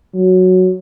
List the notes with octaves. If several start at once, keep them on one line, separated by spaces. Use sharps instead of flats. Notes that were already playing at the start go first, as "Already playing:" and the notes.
F#3